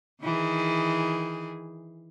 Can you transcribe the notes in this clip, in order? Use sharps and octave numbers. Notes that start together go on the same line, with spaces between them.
D#3 E3 G#4